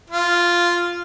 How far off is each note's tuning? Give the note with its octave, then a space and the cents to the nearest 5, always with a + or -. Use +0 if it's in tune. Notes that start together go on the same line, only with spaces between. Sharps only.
F4 -5